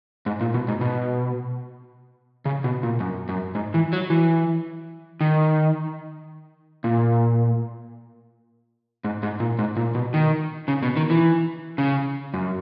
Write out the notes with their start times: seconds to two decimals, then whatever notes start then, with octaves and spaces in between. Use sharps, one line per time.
0.26 G#2
0.41 A#2
0.54 B2
0.68 G#2
0.81 B2
2.45 C#3
2.64 B2
2.83 A#2
3.00 F#2
3.29 F#2
3.55 G#2
3.74 E3
3.93 F#3
4.10 E3
5.21 D#3
6.84 A#2
9.04 G#2
9.23 G#2
9.40 A#2
9.59 G#2
9.76 A#2
9.95 B2
10.14 D#3
10.68 C#3
10.82 B2
10.96 D#3
11.10 E3
11.78 C#3
12.34 F#2